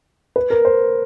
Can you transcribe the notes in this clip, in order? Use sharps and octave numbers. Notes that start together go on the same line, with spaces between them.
B4
A#4
C5